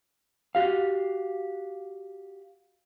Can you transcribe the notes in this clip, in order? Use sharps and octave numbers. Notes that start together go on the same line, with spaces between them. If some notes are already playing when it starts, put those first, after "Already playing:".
F#4 G4 F5